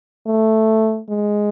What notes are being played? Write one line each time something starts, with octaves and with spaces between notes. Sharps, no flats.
A3
G#3